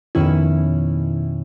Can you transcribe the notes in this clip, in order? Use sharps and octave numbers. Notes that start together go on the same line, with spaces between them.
F2 B2 D#3 C#4 E4